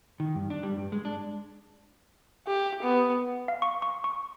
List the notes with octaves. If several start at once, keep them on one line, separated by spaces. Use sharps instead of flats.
D#3
G2
D4
G3
G2
G#3
D4
G4
B3
F5
C#6
C#6
C#6